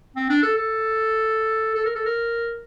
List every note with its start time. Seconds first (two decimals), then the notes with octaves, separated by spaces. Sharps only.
0.16 C4
0.29 D4
0.42 A4
0.56 A4
1.75 A4
1.85 A#4
1.95 A4
2.06 A#4